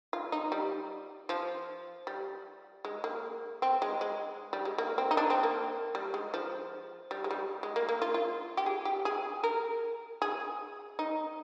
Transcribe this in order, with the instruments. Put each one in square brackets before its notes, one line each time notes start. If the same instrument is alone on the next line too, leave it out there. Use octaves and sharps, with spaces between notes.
[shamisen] F4
D#4
G3
F3
G3
G#3
A#3
C4
G#3
G#3
G3
G#3
A#3
C4
D#4
D4
C4
A#3
G3
G#3
F3
G3
G#3
G3
G#3
A#3
A#3
F4
F4
G4
G#4
G4
G#4
A#4
G#4
D#4